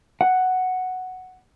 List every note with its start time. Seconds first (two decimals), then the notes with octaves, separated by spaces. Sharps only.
0.21 F#5